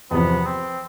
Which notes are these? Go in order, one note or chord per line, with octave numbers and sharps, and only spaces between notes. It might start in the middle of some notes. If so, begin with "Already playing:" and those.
E2 C3 F3 B3
C4